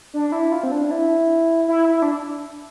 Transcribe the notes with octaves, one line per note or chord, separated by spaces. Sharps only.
D4
E4
F4
C4
D4
E4
E4
E4
D4